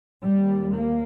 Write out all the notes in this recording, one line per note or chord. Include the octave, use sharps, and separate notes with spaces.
D#2 G3
A#3